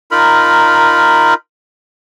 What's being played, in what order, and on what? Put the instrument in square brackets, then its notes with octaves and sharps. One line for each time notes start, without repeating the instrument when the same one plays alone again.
[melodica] D#4 F4 A#4 B5